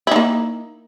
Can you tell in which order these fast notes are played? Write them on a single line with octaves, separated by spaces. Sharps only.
E4 D#4 A#3